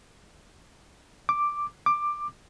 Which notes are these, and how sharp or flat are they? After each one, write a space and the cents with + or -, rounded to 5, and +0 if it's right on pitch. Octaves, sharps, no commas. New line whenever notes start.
D6 +5
D6 +15